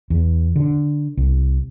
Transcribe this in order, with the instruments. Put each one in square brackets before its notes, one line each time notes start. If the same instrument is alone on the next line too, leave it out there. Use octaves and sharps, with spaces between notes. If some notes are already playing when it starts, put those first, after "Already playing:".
[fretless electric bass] E2
D3
C2